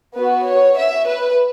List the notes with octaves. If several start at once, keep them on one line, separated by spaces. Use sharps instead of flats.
B3 F#4 B4
C#5
E5
B4